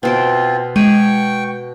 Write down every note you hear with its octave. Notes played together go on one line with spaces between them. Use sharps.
B2 C4 F4 C5 G5
G#3 G5 G#5 C#6